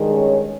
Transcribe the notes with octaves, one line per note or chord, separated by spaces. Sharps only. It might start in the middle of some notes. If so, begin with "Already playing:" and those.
Already playing: G2 D#3 G#3
C#4 C#5